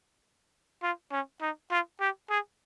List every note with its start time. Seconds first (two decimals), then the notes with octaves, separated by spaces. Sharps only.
0.82 F4
1.12 C#4
1.41 D#4
1.71 F4
2.00 G4
2.30 G#4